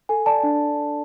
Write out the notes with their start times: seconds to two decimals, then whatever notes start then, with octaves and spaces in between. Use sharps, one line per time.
0.09 A4 G#5
0.26 D5 A5
0.43 D4